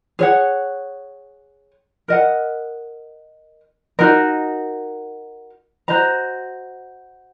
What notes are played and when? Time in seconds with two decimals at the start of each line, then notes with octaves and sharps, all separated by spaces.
0.19 G#4 C#5 F#5
2.08 A#4 D#5 F#5
3.99 D#4 F#4 A#4 D#5
5.88 F#4 C5 D#5 A#5